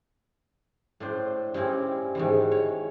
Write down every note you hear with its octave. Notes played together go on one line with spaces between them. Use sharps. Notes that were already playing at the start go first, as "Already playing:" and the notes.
A2 D4 C5
G2 C4 C#4 E4
G#2 D#3 E3
C#5